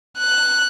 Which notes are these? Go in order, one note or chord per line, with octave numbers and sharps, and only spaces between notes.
F#6